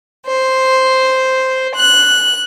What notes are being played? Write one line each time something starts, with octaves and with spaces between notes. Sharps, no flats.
C5
F#6